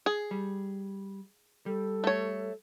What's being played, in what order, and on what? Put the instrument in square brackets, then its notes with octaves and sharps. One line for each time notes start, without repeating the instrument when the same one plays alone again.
[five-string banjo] G#4
[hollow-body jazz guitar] G3
[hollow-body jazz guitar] G3 [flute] A4
[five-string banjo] A3 C#5